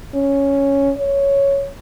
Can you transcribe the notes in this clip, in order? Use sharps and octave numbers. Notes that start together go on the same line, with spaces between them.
C#4
C#5